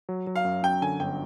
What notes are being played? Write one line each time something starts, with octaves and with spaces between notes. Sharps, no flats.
F#3
F#3
F5
F#2
F#2 G5
D3 G#5
G1 G5